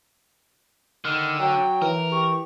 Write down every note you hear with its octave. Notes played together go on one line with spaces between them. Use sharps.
D3 D#3 F6
F#3 G5
E3 A#4
G4 C#6